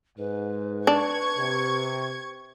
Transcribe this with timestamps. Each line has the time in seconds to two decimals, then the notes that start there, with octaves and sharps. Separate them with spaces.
0.18 G#2 B4
0.87 D4 C#6 G#6
1.37 C3